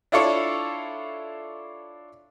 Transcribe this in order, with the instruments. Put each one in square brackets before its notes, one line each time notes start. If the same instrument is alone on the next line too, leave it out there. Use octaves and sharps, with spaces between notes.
[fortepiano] D4 E4 F4 A4 C#5 D5